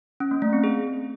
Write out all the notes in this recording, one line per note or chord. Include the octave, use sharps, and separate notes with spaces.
C#4
A#3
A3
C4
G#4